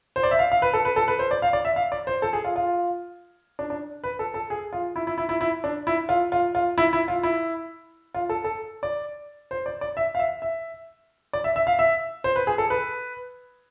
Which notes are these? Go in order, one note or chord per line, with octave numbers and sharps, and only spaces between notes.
C5
D5
E5
F5
F5
B4
A4
B4
A4
B4
C5
D5
F5
D5
E5
F5
D5
C5
A4
G#4
F4
F4
D4
D4
B4
A4
A4
G#4
F4
E4
E4
E4
E4
E4
D4
E4
F4
F4
F4
E4
E4
F4
E4
F4
A4
A4
D5
C5
D5
D5
E5
F5
E5
E5
D5
E5
E5
F5
E5
C5
B4
G#4
A4
B4